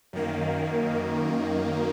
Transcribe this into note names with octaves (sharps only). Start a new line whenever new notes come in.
F#2 D#3 A#3